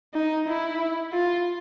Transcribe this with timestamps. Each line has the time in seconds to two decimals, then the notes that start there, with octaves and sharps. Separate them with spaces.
0.14 D#4
0.48 E4
1.13 F4